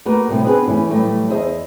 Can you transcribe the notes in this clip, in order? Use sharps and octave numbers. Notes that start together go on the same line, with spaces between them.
A3 A#3 F#4 A#4 B4
A2 C3 G3
B3 C4 D4 F#4 G#4 B4
E3 A3 C#4 E4
A2 E3 F#3 G3 A3 E4
E2 G#4 C5 D#5 E5